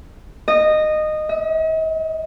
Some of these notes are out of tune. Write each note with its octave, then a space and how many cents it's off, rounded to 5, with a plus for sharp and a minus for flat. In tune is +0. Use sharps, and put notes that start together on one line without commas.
D#5 -15
D#5 +45